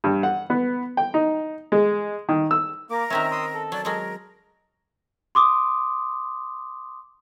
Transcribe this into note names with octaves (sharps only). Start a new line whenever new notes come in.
G2
F#5
B3
G5
D#4
G#3
D#3
E6
A#3 A#4 D6
D#3 C4 C#4 E5 A#5 F6
C6 D#6 E6
A4
F#3 D5
F#3 G#3 A#4
C6 D6 D#6